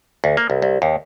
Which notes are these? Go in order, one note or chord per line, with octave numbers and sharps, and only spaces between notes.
D2
A#3
C2
C2
D#2